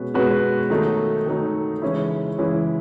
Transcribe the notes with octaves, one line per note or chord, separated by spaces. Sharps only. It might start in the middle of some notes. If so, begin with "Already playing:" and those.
Already playing: B2 G#3 C#4 F#4 B4
B2 G#3 C#4 F#4 B4
D#3 F#3 A3 D#4
D#3 F#3 A3 D#4
C#3 E3 G#3 C#4 E4
C#3 E3 G#3 C#4 E4